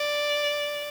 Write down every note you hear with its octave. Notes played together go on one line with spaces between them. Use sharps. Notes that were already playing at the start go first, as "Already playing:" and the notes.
Already playing: D5